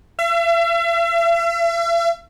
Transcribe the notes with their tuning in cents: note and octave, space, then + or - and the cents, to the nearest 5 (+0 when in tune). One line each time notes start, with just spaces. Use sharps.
E5 +40